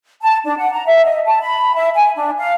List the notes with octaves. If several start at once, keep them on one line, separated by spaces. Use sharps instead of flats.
A5
D4
F#5
A#5
E5
D#5
A5
B5
E5
G#5
D4
F5